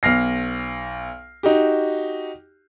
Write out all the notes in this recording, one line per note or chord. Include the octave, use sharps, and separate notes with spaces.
B1 F6 A#6 C7
D#4 F#4 G4